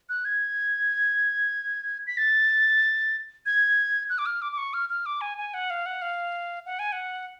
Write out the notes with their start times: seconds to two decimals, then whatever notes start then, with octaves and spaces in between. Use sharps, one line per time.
0.09 F#6
0.25 G#6
2.07 B6
2.17 A6
3.46 G#6
4.10 F#6
4.18 D6
4.26 F6
4.42 D6
4.52 D6
4.58 C#6
4.74 F6
4.89 F6
5.06 D6
5.21 G#5
5.38 G#5
5.54 F#5
5.70 F5
5.86 F#5
6.02 F5
6.66 F#5
6.79 G#5
6.92 F#5